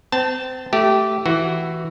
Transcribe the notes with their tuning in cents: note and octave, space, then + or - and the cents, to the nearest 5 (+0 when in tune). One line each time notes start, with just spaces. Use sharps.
C4 -30 A5 +0
A3 +0 G4 -15
E3 +0 F#4 +0